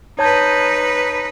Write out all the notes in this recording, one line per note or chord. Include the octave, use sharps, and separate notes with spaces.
D#4 B4 C#5 A5 G6